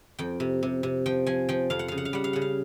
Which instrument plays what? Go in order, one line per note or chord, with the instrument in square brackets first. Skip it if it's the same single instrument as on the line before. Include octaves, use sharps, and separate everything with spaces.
[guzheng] F2 G5
C3
C3
C3
F3 G5
F3 G#5
F3 G5
F2 F5
F#5
C#3 F5
F#5
F5
G3 F#5
F5
C#3 F#5
F5